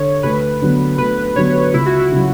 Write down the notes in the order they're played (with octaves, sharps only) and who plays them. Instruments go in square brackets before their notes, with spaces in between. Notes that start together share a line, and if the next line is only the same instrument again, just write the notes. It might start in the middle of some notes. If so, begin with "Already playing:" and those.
Already playing: [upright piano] D3 [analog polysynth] C#5
[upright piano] D2 [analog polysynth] B4
[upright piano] D3 F#3 B3
[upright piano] D2 [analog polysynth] B4
[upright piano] D3 F#3 B3 [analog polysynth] C#5
[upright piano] C#2 [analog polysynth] E4
[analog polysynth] F#4
E4
[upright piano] C#3 F#3